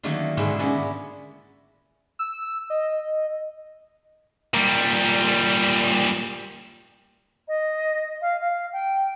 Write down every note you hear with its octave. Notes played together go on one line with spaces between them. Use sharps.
D3 D#3 F#3 A3 A#3
G#2 B2 D3 G#3 B4
A#3 B3 C#4 E4 D5
E6
D#5
A#2 G3
D#5
F5
F5
G5